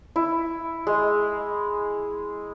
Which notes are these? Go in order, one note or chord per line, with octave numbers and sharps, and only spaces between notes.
E4
G#3